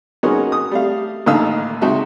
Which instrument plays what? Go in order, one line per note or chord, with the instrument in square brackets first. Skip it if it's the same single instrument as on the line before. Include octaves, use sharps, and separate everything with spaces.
[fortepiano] F#3 G#3 A#3 B3 C#4 D#4
D#6
G3 A3 F5
A1 D#2 D3 D#4 F5 E6
C#2 D#4 F#4 E5